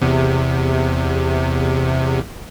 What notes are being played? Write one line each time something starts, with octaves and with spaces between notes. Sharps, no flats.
E2 C3